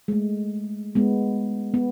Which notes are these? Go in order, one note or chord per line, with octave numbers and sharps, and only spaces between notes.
G#3
A3
G#3 B3
B3